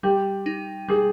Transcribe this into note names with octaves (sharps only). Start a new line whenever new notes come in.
G3 G4
D#4
G3 G#4